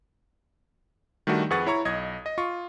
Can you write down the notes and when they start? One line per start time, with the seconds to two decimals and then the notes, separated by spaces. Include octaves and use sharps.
1.27 D#3 G3 A3 D4 F#4
1.50 F2 G#4 B4 F#5 C#6 A6
1.67 E4 C#5 A#5 C#6
1.85 B1 D#5 D#6 G#6
2.26 D#5
2.38 F4 C#6